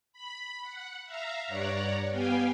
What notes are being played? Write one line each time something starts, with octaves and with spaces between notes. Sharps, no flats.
B5
F#5
E5 F5 A#5
G2 C#5 D5 F#5 A#5
B3 G4 F5 G5 G#5